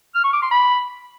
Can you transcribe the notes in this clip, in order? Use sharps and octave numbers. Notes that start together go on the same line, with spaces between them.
F6
C#6
D6
C6
B5